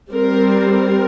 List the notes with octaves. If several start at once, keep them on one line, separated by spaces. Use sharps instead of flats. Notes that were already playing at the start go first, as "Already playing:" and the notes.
G3 C4 A#4
A#4